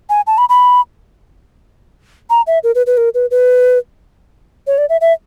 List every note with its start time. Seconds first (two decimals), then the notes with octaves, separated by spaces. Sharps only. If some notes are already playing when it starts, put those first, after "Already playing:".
0.10 G#5
0.27 A5
0.38 B5
0.49 B5
2.30 A#5
2.47 E5
2.64 A#4
2.75 B4
2.87 B4
2.97 A#4
3.14 B4
3.31 B4
4.67 C#5
4.78 D5
4.89 E5
5.01 E5